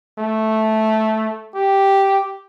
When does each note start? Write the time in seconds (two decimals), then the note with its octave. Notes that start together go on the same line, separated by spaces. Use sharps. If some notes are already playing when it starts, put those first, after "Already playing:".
0.19 A3
1.55 G4